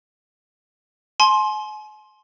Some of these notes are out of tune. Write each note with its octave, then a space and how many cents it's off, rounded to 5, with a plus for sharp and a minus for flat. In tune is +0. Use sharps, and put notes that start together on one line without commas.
G#5 +40 C6 +10